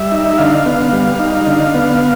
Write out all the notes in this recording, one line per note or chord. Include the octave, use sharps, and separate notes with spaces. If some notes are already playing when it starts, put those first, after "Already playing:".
Already playing: G3 E5
D#4
D3 F5
B3
G3
D#4
D3
B3